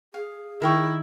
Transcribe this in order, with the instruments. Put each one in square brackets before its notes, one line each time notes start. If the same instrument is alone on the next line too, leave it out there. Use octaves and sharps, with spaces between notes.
[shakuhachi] G#4 [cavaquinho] F5
[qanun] D#3 [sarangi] E4 [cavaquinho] A#4 G5 C#6